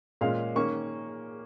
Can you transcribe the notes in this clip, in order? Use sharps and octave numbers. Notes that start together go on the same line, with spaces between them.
A#2 G#3 C#4 F5
D#3 A#3 C#4 C#6